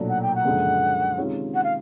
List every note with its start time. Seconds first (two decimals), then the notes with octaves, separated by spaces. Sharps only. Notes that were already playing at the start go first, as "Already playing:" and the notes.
Already playing: B1 A#2 F#3 A3 D4
0.08 F#5
0.22 G5
0.35 F#5
0.45 F#1 F#2 D3 F3 G#3
1.18 C3 D#3 G#3 C#4 F4
1.54 F#5
1.63 F5